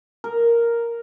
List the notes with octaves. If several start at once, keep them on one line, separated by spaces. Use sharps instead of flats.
A#4